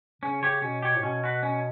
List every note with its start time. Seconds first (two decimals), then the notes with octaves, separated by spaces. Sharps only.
0.22 C#3 C#4
0.42 C#3 G4 C#5
0.62 B2 C#4
0.83 G4 C#5
0.96 A2
1.02 B2 C#4
1.24 F#4 B4
1.43 C#4